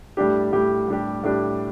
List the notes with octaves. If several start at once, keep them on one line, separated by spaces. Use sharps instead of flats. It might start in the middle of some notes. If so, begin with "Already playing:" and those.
A2 G3 D4 G4
A2 G3 D4 G4
A2 G3 D4 G4
A2 G3 D4 G4